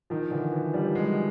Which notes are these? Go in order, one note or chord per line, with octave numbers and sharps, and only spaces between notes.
D#3 F3
D3 E3
E3 F#3
F3 G3
F#3 G#3